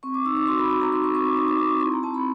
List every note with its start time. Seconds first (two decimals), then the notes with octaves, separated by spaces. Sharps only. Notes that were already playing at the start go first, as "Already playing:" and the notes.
0.03 C4 C#6
0.14 D6
0.25 D#4 E6
0.37 D6
0.47 F#4 C6
0.59 B5
0.70 F#4 B5
0.81 A#5
0.92 D#4 C6
1.04 C#6
1.14 C4 C#6
1.25 D6
1.36 D#4 D#6
1.48 D6
1.59 C4 D6
1.70 C#6
1.81 E4 C6
1.92 A#5
2.03 C4 A5
2.14 B5